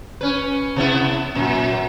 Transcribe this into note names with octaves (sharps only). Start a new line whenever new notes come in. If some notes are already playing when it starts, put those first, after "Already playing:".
C#4 B4
C3 B3 E4
F#2 A#2